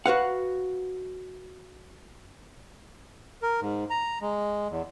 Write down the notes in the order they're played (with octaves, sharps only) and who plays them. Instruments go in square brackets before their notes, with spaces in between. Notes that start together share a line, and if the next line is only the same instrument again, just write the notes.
[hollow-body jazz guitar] F#4 B4 F5 F#5
[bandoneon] A#4
G#2
A#5
G#3
E2